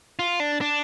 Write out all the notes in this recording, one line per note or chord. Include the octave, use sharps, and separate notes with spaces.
F4
D4
D4